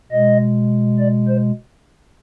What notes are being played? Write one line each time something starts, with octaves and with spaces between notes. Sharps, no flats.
B2 G#3 D#5
D5
C5